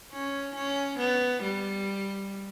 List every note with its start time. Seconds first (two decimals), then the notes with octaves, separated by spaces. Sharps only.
0.12 C#4
0.57 C#4
1.00 B3
1.44 G3